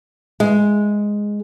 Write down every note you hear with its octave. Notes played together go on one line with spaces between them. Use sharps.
G#3